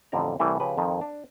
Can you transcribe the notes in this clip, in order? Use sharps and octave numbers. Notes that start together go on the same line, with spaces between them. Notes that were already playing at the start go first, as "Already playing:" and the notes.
A1 F2 D3 D#4 D5 A#5
C2 E3 G3 A3
C#3 F3 G4 B4
F2 D#3 F3
D4